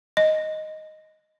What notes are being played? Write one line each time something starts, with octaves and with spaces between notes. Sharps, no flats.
D#5